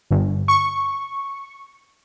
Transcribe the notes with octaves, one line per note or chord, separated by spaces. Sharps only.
G1
C#6